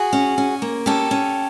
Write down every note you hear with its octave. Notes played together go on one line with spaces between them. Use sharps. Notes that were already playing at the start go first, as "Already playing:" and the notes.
Already playing: F#4 G#4
C#4
C#4
A#3
C#4 G4 A4
C#4